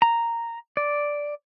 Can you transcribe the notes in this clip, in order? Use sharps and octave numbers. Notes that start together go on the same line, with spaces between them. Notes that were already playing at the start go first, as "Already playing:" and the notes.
A#5
D5